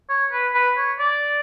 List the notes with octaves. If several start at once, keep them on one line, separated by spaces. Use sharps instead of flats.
C#5
B4
B4
C#5
D5